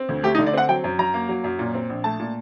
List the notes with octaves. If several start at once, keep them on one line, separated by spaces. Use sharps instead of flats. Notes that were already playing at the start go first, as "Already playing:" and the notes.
Already playing: C4
D2
A3 G4
D#4
D3
D5
C4 F#5
F#3 G5
F#2
F#2 A#5
A#3
F#3
F#2
A#2
C4
A#1
A3 A5
A#2